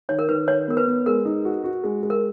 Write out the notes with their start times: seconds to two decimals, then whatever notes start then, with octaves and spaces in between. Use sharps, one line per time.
0.09 D#3 C#5
0.19 A#4
0.28 D#3 B4
0.48 D#3 C#5
0.68 B3 A#4
0.77 B4
0.87 B3
1.06 G#3 A#4
1.25 D#4
1.45 F#4
1.64 F#4
1.84 G#3
2.03 G#3
2.10 A#4